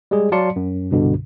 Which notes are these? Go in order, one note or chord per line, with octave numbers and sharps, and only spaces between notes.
G3 G#3 G#4
F#3 D5 F5 A5 C6 C#7
F#2
C2 G2 B2 D3